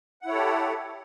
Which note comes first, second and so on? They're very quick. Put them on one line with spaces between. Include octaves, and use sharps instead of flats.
F#5 E4 C#5 A4 G4